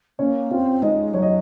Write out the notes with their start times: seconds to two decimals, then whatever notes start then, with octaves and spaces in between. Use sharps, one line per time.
0.19 A#3 C#4 C#5
0.50 C4 F4 F5
0.82 G#3 D#4 D#5
1.13 F#3 C#5
1.22 D#5